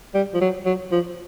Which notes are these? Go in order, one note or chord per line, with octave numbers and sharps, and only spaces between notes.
G3
F3
F#3
F#3
F3